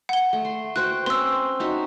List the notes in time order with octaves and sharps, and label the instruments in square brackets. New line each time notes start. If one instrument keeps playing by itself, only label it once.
[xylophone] F#5 G7
[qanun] A3
C6
[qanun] F#4 C5 G5 [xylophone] F#6
[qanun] C4 C#4 C5 [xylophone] C6 E6
[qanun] D#4 F#4 E5